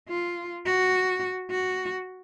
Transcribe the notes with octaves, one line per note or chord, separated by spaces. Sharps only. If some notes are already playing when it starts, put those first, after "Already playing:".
F4
F#4
F#4